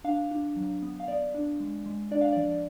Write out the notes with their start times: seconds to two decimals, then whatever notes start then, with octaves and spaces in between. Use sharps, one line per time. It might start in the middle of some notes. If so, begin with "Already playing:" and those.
0.04 D4 F5
0.31 D4
0.56 F#3
0.82 B3
1.00 F5
1.08 B3 D5
1.34 D4
1.60 G#3
1.86 G#3
2.11 D4 D5
2.21 F5
2.33 F3 D5